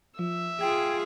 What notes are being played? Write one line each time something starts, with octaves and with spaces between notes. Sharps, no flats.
F3 E5
F4 G#4 G5 G#6